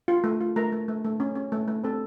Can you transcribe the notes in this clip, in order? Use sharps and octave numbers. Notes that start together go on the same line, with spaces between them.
F4
A3
F4
A3 A#4 A#5
A3
A3
A3
C#4
C#4
A3
A3
C4 A4 A5